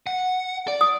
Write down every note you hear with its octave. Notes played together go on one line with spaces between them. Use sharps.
F#5
D5
D#6